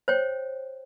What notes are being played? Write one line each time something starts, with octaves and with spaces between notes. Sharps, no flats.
C5 C#5 G5